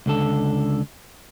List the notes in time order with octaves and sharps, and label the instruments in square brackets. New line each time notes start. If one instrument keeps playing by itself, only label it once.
[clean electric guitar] C#2 D3 A4